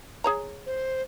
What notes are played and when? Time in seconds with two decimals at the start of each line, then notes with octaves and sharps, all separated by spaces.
0.24 G#4 C#5 A#5
0.66 C5